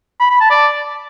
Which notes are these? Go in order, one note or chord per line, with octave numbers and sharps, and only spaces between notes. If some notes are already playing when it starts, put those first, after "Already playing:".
B5
B5
A5
D5